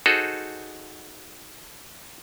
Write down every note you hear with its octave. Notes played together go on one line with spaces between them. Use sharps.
D#4 F#4 G#4 A4 C5